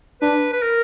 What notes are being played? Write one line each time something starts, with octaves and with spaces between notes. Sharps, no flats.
D4 B4
B4
A#4